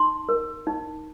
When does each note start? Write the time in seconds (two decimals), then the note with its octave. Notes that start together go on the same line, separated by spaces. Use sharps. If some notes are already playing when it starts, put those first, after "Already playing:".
Already playing: D#4 C6
0.29 A#4
0.67 D#4